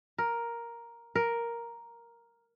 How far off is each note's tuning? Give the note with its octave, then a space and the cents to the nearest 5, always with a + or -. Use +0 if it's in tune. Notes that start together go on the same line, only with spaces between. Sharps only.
A#4 +5
A#4 +5